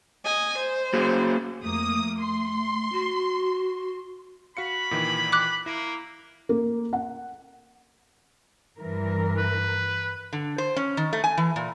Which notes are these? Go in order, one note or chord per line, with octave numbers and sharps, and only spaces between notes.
D#5 G#5
C5
A#3 F#4 G#4
F2 A3 A#3 D#6
C6
F#4
F#4 F5 B5 C#7
A#2 D#3 E3
D6 F#6
A#3 E4
A#3
F#5
G2 E3 A#4
B4
D3
C5
C#4
D#3
A3
G#5
E3
A#2